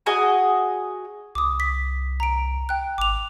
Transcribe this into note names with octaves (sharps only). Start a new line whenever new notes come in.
F#4 G#4 D#5 G#5
C2 D6 D#6
B6
A#5 D7
G5 F#6
G#1 D6 F7